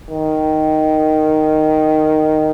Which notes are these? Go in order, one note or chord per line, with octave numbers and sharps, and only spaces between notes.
D#3